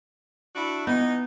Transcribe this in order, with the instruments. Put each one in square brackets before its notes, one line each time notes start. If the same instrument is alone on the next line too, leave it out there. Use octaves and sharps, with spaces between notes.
[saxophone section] D4 E4 F#4
[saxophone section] E3 D#4 [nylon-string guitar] B3